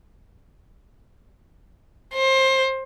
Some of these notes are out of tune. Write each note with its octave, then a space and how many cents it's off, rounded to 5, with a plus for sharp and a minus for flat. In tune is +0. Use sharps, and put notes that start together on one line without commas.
C5 +25